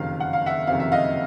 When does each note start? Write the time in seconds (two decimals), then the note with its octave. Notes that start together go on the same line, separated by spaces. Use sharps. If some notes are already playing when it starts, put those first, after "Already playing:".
Already playing: F#1 F2 C3 D#3 F5
0.20 F#5
0.33 F5
0.46 E5 F#5
0.67 F#1 F2 C3 D#3 F5
0.80 E5
0.92 D#5 F5